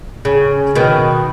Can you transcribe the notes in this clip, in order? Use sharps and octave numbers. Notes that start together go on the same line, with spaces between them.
C#3
B2 D#3